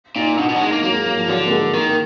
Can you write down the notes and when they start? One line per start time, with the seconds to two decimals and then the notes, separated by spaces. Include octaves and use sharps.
0.16 A#2 D#4
0.38 B2 D4
0.49 B2
0.56 F#3
0.61 G#3 D#4
0.72 A#3
0.83 F#3 A#3
0.94 G#3
1.06 F#3
1.17 F3
1.28 D3 F#3
1.46 A#3
1.50 G#3
1.74 D#3 A#3
1.89 A#3